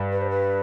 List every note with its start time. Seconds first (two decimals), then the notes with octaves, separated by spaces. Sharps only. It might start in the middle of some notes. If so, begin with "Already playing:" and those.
Already playing: G2
0.12 B4
0.22 C5
0.30 B4